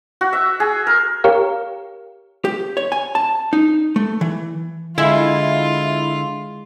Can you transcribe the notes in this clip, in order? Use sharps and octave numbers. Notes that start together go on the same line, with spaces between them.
F#4
E5
G#4
A#4
G4 A#4 C#5 F5
G4
C#5
G#5
A5
D#4
A3
E3
D3 G#3 E4 F4